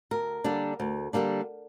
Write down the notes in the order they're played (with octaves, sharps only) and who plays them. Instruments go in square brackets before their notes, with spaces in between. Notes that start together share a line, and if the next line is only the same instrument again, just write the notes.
[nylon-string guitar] D2 A#4
D3 G3 A#3 D4
D2
D3 G3 A#3 D4